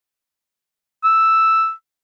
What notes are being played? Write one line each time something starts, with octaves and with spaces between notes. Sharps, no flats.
E6